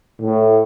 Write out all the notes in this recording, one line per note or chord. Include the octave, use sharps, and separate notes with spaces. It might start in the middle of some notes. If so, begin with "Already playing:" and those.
A2